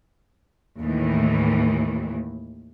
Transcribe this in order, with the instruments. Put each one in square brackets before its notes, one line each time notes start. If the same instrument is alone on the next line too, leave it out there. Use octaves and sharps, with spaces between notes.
[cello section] D#2 A2 D#3 E3